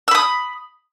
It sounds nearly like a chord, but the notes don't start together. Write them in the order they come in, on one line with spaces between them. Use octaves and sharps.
E6 B5 D#6